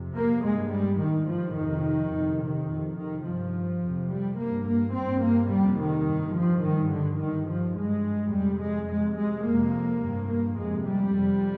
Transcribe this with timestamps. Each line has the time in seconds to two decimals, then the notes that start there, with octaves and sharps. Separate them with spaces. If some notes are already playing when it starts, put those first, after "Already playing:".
Already playing: F2 C3
0.15 A#3
0.42 G2 G#3
0.71 G3
0.99 G2 D#3
1.27 F3
1.55 F2 C3 D#3
2.12 F2 C3
2.40 D#3
2.68 F2 C3
2.96 D#3
3.25 G2 F3
3.81 F2 C3
4.09 G3
4.37 G2 A#3
4.65 A#3
4.93 G2 C4
5.21 A#3
5.50 F2 C3 G3
5.78 D#3
6.06 G2
6.35 F3
6.62 G2 D#3
6.91 D3
7.19 G2 D#3
7.47 F3
7.75 G2 G#3
8.32 F2 C3 G3
8.60 G#3
8.88 F2 C3 G#3
9.16 G#3
9.44 F2 C3 A#3
10.01 G2
10.29 A#3
10.57 F2 C3 G#3
10.85 G3
11.13 F2 C3